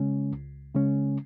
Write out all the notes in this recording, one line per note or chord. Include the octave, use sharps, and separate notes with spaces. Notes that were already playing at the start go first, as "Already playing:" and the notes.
Already playing: C#3 G#3 C#4
C#2
C#3 G#3 C#4